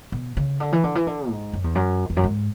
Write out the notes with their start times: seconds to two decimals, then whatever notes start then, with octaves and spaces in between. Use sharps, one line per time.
0.12 B2
0.37 C#3
0.60 D3
0.72 E3
0.84 D3
0.95 E3
1.07 D3
1.30 G#2
1.53 F#2
1.64 E2
1.75 F#2
2.10 E2
2.17 F#2
2.24 G#2